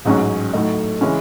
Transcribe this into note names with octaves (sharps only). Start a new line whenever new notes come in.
A1 G#2 F#3 C#4
A2 F#3 A3 D#4
C#3 E3 G#3 C#4